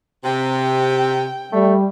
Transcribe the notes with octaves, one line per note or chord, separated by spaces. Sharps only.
C3 G5
G3 A3